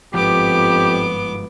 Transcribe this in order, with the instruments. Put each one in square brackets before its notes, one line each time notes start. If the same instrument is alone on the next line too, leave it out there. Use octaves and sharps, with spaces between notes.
[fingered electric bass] G1 G#2 F3 [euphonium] F2 [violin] B3 D6 [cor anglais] G4